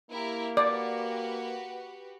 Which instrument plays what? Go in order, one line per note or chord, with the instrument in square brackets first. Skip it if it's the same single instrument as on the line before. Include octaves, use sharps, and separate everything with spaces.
[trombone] A#3 [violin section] E4 G4 A#4
[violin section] F#4 G4 B4 [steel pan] D5